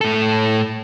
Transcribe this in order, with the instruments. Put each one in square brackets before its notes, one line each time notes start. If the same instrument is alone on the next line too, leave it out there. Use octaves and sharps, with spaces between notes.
[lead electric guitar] A2 A4